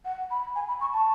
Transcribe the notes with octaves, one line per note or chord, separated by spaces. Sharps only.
F#5
B5
G#5
B5
C#6
A5